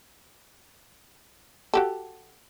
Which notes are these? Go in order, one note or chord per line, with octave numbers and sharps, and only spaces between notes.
F#4 G4 A4